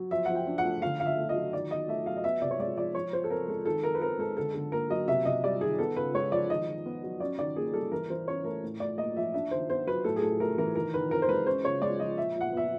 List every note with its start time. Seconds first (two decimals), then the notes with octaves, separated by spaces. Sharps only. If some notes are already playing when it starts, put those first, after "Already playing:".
Already playing: F#3
0.11 F3 E5
0.25 F3 F#5
0.35 G5
0.47 D4
0.58 F#5
0.65 A3
0.82 D3 F5
1.00 D3 F5
1.06 E5
1.17 A3
1.29 D#5
1.35 F#3
1.53 D#3 D5
1.71 D#3 D#5
1.88 A3 E5
2.06 F#3 F5
2.17 D#5
2.24 B3 E5
2.41 C3 D5
2.51 C#5
2.59 G#3 D5
2.77 F3 D5
2.95 F3 C#5
3.13 F3 C5
3.24 A4
3.30 C4 A#4
3.48 G#3 A4
3.65 D#3 A4
3.84 D#3 A#4
3.95 B4
4.01 C4 A#4
4.19 G#3 A4
4.37 D3 A4
4.54 D3 A4
4.72 A#3 A#4
4.90 F#3 D#5
5.07 C3 E5
5.25 C3 D#5
5.44 G3 D5
5.61 D#3 G#4
5.79 B3 A4
5.96 C#3 B4
6.14 G#3 C#5
6.32 F3 D5
6.50 D#3 D#5
6.68 D#3
6.86 B3
7.03 F#3
7.20 C#4 D5
7.38 D#3 D5
7.56 A#3 G#4
7.73 G3 A4
7.92 E3 A#4
8.10 E3 C5
8.27 C#4 C#5
8.44 A3 A#4
8.63 A2
8.80 A2 D5
8.98 A#3 D#5
9.16 F3 E5
9.34 D4 E5
9.51 D#3 C5
9.70 B3 C5
9.87 F#3 B4
10.04 A2 A4
10.16 G#4
10.22 A2 A4
10.40 A3 A#4
10.58 E3 A#4
10.75 D#3 A#4
10.94 D#3 B4
11.11 C4 A#4
11.22 C5
11.29 G#3 B4
11.47 C#4 C5
11.64 C#3 C#5
11.82 G#3 D5
12.00 F3 D#5
12.18 A#2 E5
12.35 A#2
12.41 F#5
12.53 B3 E5